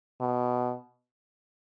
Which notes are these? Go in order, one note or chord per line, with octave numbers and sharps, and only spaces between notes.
B2